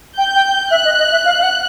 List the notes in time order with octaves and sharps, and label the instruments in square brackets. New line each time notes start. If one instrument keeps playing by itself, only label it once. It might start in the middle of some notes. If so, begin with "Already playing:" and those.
[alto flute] G5 [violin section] G6
[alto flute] G5
[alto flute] E5 [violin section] F#6
[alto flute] D#5
D#5
E5
F5
F5
F#5